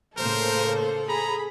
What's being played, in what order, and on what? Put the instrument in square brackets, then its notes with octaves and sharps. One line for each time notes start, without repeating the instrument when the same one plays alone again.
[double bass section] A2 C#3 A#3 [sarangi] A4 [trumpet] A#4 [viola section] C5
[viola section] G#4 B5 [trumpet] A#5